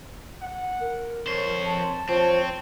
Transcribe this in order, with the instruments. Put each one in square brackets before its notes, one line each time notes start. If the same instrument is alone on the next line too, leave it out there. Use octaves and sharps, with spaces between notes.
[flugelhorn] F#5
[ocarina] A#4
[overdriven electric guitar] F2 C5 [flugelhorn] C#5
[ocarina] A5
[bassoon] F3 [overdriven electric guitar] C4 [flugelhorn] C#5